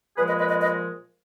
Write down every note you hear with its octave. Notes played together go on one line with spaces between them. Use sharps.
A#2 F3 G#3 G#4 B4
B4 D#5
B4 D#5
B4 D#5
B4 D#5